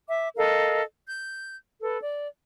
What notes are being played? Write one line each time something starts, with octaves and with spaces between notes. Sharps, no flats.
E5 D6
A4 A#4 D#5 F5
G6
A4 B4
D5